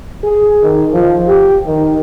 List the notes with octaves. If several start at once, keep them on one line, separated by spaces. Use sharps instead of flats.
G#4
D#3
F3
G4
D#3